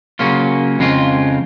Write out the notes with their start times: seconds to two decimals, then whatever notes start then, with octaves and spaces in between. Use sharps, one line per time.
0.19 C#3 F#3 A#3 C#4 F4
0.79 F2 C#3 G#3 C4 F4